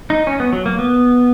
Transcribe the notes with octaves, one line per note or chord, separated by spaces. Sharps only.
D#4
C#4
B3
F#3
A#3
B3